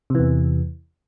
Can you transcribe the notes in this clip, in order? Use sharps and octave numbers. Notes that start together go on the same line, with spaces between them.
E2 C3 E3